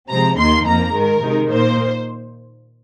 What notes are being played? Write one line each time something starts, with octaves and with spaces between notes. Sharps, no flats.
C3 F3 G#3 C4 A#5
D#2 D#3 A#3 D#4 C6
F2 F3 A#3 A#5
G#2 D#3 G#3 A#4
C3 D#3 G#3 D#4
A#2 A#3 D#4 C5